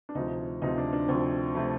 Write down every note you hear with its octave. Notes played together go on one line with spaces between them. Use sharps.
D4
D2 C3 F3 D#4
D2 C3 F3 D#4
D4
D4
D2 C3 F3 C4
C3 F3 A3